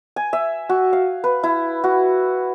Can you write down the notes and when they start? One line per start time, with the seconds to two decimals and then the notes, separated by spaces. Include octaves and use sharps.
0.16 G#5
0.33 E5
0.69 F#4
0.93 F5
1.24 B4
1.43 E4
1.84 F#4